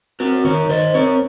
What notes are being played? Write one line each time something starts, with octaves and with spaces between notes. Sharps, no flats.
C4 F#4 A#4
D#3 A#4 C#5
D#3 C5 D#5
C4 A#4 C#5